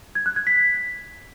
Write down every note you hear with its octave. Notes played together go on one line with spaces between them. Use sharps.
G#6
F#6
G#6
B6